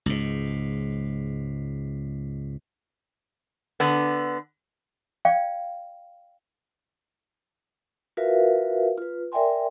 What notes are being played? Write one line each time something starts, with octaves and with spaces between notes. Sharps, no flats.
C#2 G#2
D3 B3
D5 F5 G5
F4 F#4 A#4 B4 E5 F5
F4 B4
A#4 D5 E5 G5 G#5 C6